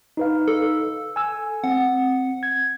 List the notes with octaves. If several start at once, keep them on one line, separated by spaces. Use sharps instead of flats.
D#4 B4 F5
A4
G#5 E6
C4 F#5
G#6